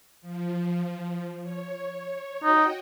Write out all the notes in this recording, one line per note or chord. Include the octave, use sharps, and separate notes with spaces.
F3
C#5
D#4 F#4 D#5 G5